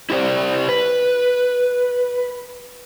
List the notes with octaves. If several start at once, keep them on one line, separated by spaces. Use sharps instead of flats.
E4 G4 C5 D5
B4